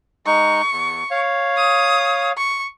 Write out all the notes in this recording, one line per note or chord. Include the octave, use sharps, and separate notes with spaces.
G#3 D#4 C#6
E2
C#5 F5
D#6
C#6